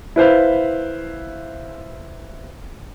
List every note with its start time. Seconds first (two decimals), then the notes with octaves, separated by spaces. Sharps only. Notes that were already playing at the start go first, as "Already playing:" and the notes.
0.16 E4 B4 C5 F5